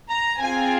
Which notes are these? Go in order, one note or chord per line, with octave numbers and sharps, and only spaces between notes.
A#5
C4 F4 G#4 G#5